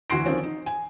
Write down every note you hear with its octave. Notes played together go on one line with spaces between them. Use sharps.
D2 E3 F#4 C6 C7 D7
D3 D#3 F3 C4 C#4
D#4
G#5